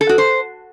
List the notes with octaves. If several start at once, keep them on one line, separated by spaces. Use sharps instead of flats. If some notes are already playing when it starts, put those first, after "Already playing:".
A4
F#4
C5